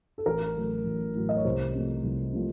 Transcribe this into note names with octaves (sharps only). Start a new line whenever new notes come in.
A4
A1 A#4
A2 F#3
A1
A2 F#3
D#5
C#5
C2 C5
C3 F3 A3
C2
C3 F3 A3